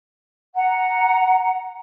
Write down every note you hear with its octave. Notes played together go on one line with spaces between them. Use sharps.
F#5 A#5